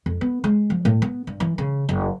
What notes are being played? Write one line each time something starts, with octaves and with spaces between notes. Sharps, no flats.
F2
B3
G#3
F3
A2
B3
G2
E3
C#3
F#1